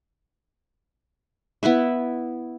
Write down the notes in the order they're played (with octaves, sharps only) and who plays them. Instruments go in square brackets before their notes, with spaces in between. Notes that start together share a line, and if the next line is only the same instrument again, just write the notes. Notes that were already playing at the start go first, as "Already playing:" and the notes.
[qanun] B3 E4 B4 E5